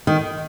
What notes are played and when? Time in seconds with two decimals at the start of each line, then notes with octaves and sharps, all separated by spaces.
0.07 D#3